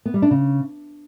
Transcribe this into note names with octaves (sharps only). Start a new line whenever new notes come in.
B3
G3
D4
C#3